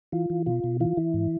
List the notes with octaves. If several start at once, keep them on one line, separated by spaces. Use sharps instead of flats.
E3 F4
E3
B2 F4
B2
E3 F4
E3 E4
G#2